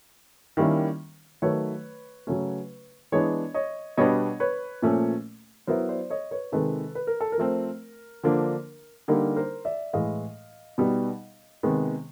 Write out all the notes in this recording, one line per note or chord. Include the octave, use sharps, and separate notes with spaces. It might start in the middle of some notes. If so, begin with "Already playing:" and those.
D#3 G3 A#3 C#4 E4
D#3 F#3 A3 B4 C#5
C#3 F#3 A3 C#4
E3 G#3 B3 D4 C#5 D#5
C#5 D#5
B2 G3 B3 D4 C#5 D#5
B4 C#5
A#2 F3 A3 C#4
F#3 B3 E4 A#4 C5
C5 D5
C#5 D#5
B4 C#5
C3 D#3 G#3 A4 B4
B4
A#4
A4
A#4
F3 A3 C4
D3 F3 A#3 D4
D3 G3 A#3 D#4 A#4
A#4 C5
D5 E5
A2 E3 G#3 D#5 F5
B2 G3 B3 D#4
C3 D#3 G#3 B3